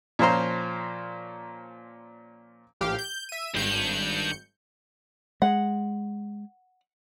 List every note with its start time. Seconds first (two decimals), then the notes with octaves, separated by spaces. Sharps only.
0.19 A#2 F3 C#4 C5 A#5 C6
2.81 A#1 G4 F5
2.99 G6
3.29 E5 D#7
3.54 G#1 G2 G6 C#7
5.42 G#3 F#5